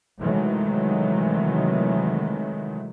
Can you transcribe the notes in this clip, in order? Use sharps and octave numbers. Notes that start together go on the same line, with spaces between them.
C3 D#3 E3 F#3 G#3 A3